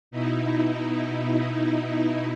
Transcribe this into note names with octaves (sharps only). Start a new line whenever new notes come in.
B2 D#4 E4